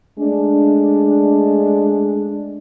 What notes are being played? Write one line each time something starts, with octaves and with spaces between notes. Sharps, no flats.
G#3 A3 D4